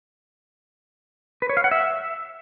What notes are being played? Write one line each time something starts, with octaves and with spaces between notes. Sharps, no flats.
B4
C#5
F5
F#5
E5